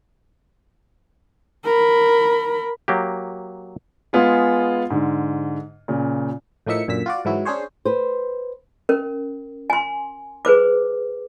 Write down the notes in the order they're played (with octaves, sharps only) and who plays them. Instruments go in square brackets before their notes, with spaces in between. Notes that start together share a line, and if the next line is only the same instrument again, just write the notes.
[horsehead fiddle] A#4 B5
[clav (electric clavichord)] F#3 A#3 G4
[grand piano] G#3 B3 F4 G#4
G#2 D3
A#2 C#3
[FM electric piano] A2 F3 A#3 D#4 E5 C#7
F#2 A#2 D3 E6 B6
F4 F#4 D5
G#2 E3 F#3 E4 F#4
C#4 D4 G#4 C5 C#5
[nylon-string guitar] B4 C5
[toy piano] C#4 A#4
G#5 C6
G#4 B4 C5 D6